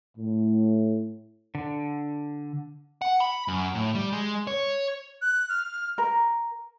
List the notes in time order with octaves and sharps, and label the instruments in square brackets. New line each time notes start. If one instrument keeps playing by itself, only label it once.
[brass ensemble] A2
[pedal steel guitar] D3
[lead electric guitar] F#5
B5
F#2
A2
G3
G#3
C#5
[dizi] F#6
F6
[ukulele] A#4